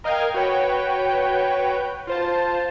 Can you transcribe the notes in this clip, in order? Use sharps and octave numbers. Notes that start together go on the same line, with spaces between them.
A#4 D#5 F5 G5 F6 G#6
F#4 B4 C#5 G5
F4 C5 A5